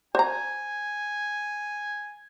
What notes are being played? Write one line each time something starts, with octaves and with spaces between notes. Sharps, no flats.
C5 G#5 A#5